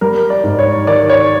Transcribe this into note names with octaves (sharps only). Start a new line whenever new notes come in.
G3 A#4
D5
G#2
C#5
D#3 D5
C#5